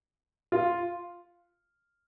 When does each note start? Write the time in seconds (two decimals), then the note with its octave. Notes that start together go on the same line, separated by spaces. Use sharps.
0.52 F4